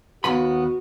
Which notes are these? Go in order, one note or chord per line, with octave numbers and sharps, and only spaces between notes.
D#2 B3 F#4 B5